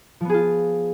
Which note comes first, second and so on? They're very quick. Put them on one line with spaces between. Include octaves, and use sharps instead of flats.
F3 B3 G#4 F4